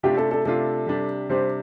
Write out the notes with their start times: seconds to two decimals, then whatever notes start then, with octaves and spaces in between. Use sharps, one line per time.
0.03 C3 A3 D4 F4 G4
0.17 A4
0.31 A4
0.45 C3 A3 D4 F4 A4
0.87 C3 G3 D4
1.29 C3 G3 D4 C5